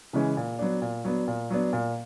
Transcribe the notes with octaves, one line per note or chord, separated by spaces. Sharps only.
C#3 E3 G#3 C#4
A#2
F#3 B3 D4
A#2
F#3 B3 D4
A#2
F#3 B3 D4
A#2